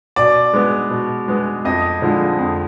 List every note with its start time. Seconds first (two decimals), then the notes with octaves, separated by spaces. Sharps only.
0.16 B2 D5
0.53 G#3 B3
0.91 B2
1.28 G#3 B3
1.65 F2 D#5
2.02 D3 F3 G#3
2.39 F2